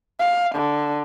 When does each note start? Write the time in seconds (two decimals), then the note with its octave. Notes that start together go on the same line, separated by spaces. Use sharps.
0.20 F5
0.55 D3